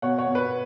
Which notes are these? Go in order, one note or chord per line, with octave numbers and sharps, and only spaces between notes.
B2 C#5 F#5
C#5 F#5
B2
B4